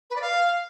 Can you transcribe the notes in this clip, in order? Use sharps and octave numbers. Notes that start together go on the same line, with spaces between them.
B4
D5
F5